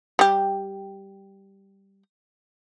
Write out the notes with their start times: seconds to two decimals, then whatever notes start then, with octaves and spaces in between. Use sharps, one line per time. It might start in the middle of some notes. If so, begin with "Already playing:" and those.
0.19 G3 G4